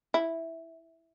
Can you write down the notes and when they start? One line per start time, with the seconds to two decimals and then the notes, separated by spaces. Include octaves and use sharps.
0.14 E4